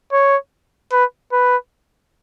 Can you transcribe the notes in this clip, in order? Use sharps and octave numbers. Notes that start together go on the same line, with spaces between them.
C#5
B4
B4